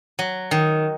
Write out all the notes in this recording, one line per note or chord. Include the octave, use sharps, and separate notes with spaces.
F#3
D#3